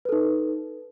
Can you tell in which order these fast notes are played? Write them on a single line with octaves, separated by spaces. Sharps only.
B4 A4 D#4